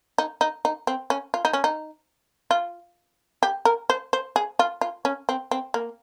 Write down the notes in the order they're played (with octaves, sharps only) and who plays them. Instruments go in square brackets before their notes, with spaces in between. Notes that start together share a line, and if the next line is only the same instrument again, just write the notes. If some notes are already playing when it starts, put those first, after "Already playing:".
[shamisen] D#4
D#4
D#4
C4
C#4
F4
D#4
C#4
D#4
F4
G4
A#4
C5
C5
G#4
F4
F4
C#4
C4
C4
A#3